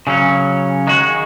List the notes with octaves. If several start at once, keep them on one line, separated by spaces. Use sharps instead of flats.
C#3 F#3 C#4
D#3 G#3 F#4